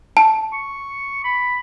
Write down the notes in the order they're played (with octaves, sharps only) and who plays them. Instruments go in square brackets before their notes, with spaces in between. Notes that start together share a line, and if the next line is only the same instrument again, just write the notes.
[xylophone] A5
[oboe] C#6
B5